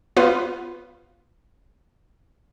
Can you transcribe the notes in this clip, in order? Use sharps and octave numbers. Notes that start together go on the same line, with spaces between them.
B3 F4 B4